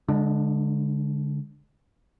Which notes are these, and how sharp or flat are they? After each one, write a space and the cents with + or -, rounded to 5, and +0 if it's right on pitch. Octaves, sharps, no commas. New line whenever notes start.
D3 -25 G#3 +0 D4 +35